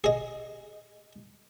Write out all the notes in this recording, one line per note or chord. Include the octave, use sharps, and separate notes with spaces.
G#4 D#5